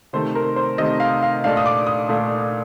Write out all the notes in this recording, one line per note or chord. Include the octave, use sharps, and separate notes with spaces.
C3 D#3 A3 C4 C5
A#4
C5
C3 D#3 A3 C4 D#5
F5
F5
A#2 A3 D4 F5
D#6
D6
D#6
A#2 A3 D4